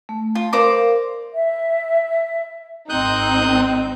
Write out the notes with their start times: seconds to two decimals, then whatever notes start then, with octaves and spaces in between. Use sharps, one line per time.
0.09 A3
0.35 F4
0.53 A#4 C5 D5 F5 D6
1.34 E5
2.89 G#1 C4 D#4 D#6 F#6 G6